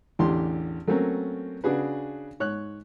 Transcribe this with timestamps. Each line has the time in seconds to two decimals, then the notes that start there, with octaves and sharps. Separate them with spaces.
0.19 A1 E2 D3 G4 C6
0.87 F#3 A3 A#3 C4 C#4 A#4
1.64 C#3 D4 F#4 G#4 B4
2.40 G#2 C#5 F#6